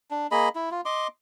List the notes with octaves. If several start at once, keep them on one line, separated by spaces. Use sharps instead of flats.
D4
A#3 G#4 D#5 B5
E4
F4
D#5 C6 D6